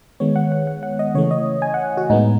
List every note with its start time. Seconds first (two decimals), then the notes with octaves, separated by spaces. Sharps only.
0.20 D#3 G#3 B3 C#5
0.36 F#5
0.52 F#5
0.67 F#5
0.83 F#5
0.99 D#5
1.14 C#3 E3 A3 C#5
1.31 D#5
1.62 G#5
1.74 F#5
1.97 F#4
2.10 A2 G#3 B3 D#4